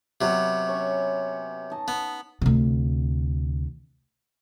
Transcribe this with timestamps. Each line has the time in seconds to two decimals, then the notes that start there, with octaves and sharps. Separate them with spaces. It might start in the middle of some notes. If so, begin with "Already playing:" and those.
0.21 C3 F#3 B3
0.68 C#4 C#5 C#6
1.71 D#4 D#5 A5
1.88 B3
2.42 D2 C3